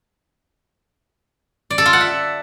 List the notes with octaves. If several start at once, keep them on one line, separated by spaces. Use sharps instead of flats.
D5
A4
F4
F#5
E5